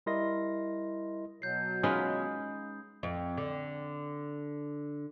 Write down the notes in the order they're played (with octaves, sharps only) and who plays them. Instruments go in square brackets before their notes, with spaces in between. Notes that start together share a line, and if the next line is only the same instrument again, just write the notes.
[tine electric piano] G3 E4 A#4 D#5 C6 A#6
[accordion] B2 F#3 [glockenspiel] G6 C7
[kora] G#3 B4 [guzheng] C#4 D#4 F4 [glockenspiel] D#6
[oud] F2
D3